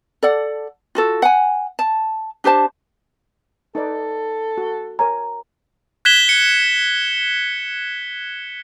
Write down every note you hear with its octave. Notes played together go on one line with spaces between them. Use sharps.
A4 D5 F#5
F4 F#4 A4
F#5 G#5
A5
D4 G4 C5 A5
D#4 A4 B4 D5
F#4
A#4 C#5 G#5 A#5
F#6 G#6 B6 E7 G7
C#7